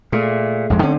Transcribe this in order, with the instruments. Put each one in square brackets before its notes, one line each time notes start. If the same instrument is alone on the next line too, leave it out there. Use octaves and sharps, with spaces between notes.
[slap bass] A#2 [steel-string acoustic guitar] A3 G#4
[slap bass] A1 F2 G#3
[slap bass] D3 C4 [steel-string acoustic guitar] C#4